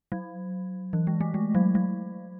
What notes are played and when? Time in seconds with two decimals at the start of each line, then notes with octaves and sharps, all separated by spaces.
0.12 F#3
0.93 E3
1.07 G#3
1.21 A3
1.34 G#3
1.55 F#3
1.75 F#3